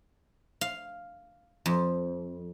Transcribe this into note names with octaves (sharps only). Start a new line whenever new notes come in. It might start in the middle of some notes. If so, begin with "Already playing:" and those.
F5
F2